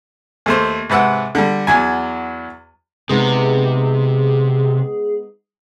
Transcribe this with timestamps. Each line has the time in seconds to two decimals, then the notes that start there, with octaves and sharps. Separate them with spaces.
0.46 D#2 A3 C5
0.90 G#2 C3 B4 F#5 E6
1.35 D3 G3
1.67 E2 F#3 G#5
3.09 C3 G#3 B3 D#4 G#4